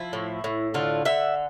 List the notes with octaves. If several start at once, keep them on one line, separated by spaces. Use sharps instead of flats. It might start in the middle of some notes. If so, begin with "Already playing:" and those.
Already playing: F3 E4
A2
A2
D3 F4
D3 E5